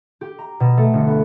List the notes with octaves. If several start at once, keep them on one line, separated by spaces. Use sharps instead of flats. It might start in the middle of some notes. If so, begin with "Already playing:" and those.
G4
A#5
B2
A3
G1
B3